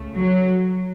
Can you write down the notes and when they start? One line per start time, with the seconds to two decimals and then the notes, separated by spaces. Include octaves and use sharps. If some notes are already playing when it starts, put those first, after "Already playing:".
Already playing: C#2 C#3 A3
0.17 F#3